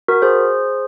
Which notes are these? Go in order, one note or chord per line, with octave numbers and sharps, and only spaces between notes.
F#4 A#4
G#4 C5